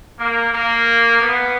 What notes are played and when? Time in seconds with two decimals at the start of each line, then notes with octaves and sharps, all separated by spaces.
0.20 A#3
0.52 A#3
1.20 B3